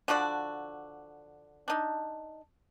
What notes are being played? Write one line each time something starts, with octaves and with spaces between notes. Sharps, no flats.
D3 F3 F#4 D5
D4 D#4